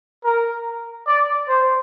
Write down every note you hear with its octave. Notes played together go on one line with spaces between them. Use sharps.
A#4
D5
C5